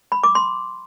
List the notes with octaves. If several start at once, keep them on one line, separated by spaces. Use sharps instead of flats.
B5
D6
C6